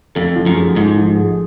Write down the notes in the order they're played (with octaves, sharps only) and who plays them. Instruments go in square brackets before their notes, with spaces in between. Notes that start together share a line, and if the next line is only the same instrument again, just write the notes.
[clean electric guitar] F2 [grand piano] A3
[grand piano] F3
[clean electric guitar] F#2
[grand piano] G#4
[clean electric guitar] G#2 [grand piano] F3
[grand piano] F3
G#4